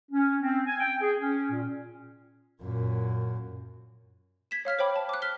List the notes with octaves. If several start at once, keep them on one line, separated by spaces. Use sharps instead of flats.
C#4
C4
G#5
G5
G#4
C#4
A#2
F#2 A#2
G#6 B6 E7
C#5 F5 F6 B6
C5 C#5 G5 B5 D6
A5
D6 F#6
F6 B6 G7